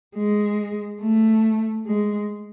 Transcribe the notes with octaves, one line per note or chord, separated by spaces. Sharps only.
G#3
A3
G#3